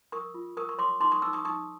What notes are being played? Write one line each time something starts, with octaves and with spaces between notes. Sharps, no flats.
A#4 C#6 D#6
F4
A#4 C#6 D#6
C#6
C#5 C6 D6
D#4 C6 D6
C#6 D#6
D#4 D6 E6
C#6 D#6
D#4 C#6 D#6